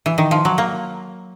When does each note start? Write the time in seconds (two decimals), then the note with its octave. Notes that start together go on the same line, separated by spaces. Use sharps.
0.06 E3
0.18 D#3
0.31 F3
0.45 F#3
0.58 A#3